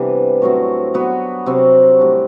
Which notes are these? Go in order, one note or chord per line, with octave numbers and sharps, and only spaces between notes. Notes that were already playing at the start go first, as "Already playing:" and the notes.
Already playing: C3 E3 G3 B3 D4
A2 F#3 C4 F#4
F#3 B3 F#4
C3 F#3 C4
A2 G3 D4